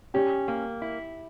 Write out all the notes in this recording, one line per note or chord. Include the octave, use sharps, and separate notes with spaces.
C#4 G4
A#3
E4